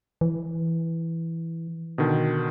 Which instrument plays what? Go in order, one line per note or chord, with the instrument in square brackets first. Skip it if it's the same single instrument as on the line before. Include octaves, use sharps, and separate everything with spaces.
[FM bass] E3
[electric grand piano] B2 D3 D#3